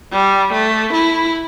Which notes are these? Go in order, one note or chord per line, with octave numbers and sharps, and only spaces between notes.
G3
A3
E4